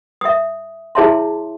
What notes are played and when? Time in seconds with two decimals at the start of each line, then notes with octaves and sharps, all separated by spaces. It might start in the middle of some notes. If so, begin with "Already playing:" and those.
0.21 E5 D#6
0.95 E4 G#4 C#5 E5 A5 C6